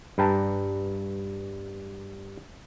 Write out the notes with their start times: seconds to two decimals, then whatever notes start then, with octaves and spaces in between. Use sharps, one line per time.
0.18 G2 B4 G5 A5 A#5